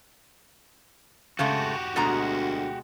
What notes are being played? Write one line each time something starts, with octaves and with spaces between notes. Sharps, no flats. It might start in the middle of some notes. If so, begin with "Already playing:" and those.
C#3 G#3 A3 F#4 G4
D2 B2 G#3 A#5